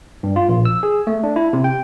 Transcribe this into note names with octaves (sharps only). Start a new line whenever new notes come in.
G2
F4
A#1
E6
G#4
A3
D4
E4
C3
G5